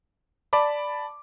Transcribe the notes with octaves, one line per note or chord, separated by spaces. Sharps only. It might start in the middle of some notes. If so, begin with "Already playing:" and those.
D5 A5 B5 D6